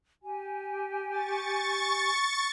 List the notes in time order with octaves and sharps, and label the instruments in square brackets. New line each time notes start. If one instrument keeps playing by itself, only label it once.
[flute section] G4 G#5
[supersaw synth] C#6 A6